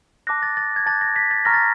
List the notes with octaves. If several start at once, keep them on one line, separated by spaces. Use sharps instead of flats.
A5 D6 F#6 A#6
A6
A6
G#6
A5 D6 F#6 A6
A#6
B6
A6
A#5 C#6 F6 A#6
A6